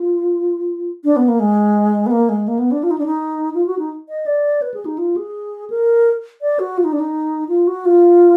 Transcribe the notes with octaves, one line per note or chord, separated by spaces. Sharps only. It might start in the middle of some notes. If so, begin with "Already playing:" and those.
Already playing: F4
D4
B3
A#3
G#3
B3
A#3
G#3
A#3
B3
D4
F4
D#4
D4
D#4
F4
F#4
D#4
D#5
D5
B4
G#4
D#4
F4
G#4
A#4
D5
F#4
F4
D#4
D4
D#4
F4
F#4
F4